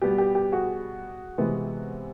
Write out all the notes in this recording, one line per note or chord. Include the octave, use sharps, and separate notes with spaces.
B2 G3 B3 G4
G4
G4
F#4 G#4
C3 E3 G#3 B3